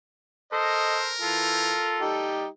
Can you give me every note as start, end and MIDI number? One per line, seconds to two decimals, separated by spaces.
0.52 1.12 69
0.52 2.04 70
0.52 1.13 72
0.52 0.96 75
1.21 1.74 52
1.21 2.03 65
1.21 2.42 69
2.01 2.46 55
2.01 2.46 63
2.01 2.46 67